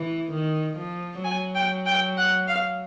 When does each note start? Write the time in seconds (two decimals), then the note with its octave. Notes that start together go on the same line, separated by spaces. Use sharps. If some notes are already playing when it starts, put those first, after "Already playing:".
Already playing: E3
0.32 D#3
0.77 F3
1.24 F#3 G#5
1.55 G5
1.86 G5
2.17 F#5
2.48 F5